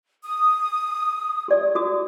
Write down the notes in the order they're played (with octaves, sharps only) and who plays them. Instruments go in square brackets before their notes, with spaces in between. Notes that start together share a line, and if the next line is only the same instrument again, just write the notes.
[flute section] D#6
[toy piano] G4 D5
F#4 D#6